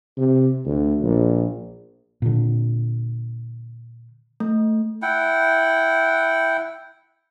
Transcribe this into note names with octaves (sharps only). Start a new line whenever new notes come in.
C3
D2
A#1
A#2 D3
A3
E4 F#5 G5